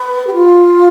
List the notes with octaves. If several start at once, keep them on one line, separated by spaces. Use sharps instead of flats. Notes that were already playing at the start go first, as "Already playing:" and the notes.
Already playing: B4
G4
F4